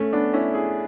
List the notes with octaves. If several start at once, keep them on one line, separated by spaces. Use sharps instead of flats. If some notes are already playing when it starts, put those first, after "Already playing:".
Already playing: A3 C#4
B3 D4
C#4 E4
E4 G#4